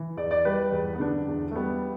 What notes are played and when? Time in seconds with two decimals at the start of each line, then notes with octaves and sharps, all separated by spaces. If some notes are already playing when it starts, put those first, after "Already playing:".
Already playing: E3
0.17 E2 D5
0.31 D5
0.45 G3 B4
0.72 E2
0.95 B3
1.00 D3 D4
1.28 E2
1.51 A3
1.55 G3 B3